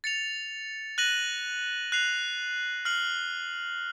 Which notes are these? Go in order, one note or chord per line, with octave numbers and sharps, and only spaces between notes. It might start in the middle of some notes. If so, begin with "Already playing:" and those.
A6 C#7 F7
F#6 A#6 D#7 F#7
F#6 C7 F7
F6 C7 F#7